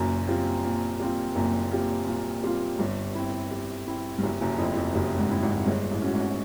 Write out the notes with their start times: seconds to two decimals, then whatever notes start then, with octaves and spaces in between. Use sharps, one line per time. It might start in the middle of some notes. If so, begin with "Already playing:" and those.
Already playing: F#1 F#2 A#2
0.28 G3 C4 F4
0.64 A#2
1.00 G3 C4 F4
1.35 F#1 F#2 A#2
1.72 G3 C4 F4
2.07 A#2
2.44 G3 C4 F4
2.79 G1 G2 G3
3.15 C4 E4
3.51 G3
3.88 C4 E4
4.18 G2
4.22 F#1 F#2 G3
4.41 F#1 F#2
4.58 F2 C4 E4
4.76 F2
4.94 F#1 F#2 G3
5.18 G#1 G#2
5.30 C4 E4
5.42 G#1 G#2
5.66 G1 G2 G#3
5.91 A1 A2
6.02 C#4 F#4
6.14 G#1 G#2